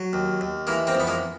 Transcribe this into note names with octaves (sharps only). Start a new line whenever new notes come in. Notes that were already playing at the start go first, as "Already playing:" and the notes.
Already playing: F#3
D#2
D#2
E3 G#3 A#3
A#3 C4
F2
B3
G#3 A#3